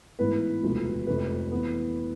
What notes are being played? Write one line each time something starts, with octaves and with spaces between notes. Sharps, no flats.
A1 G#2 E3 B3 B4
E1 D2 C3 F3
F1 F2 C3 B4
E3 B3